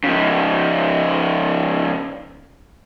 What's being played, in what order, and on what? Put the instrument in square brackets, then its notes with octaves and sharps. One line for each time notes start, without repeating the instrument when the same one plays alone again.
[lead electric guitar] C#3 F3